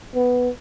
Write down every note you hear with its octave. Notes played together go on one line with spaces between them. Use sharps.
B3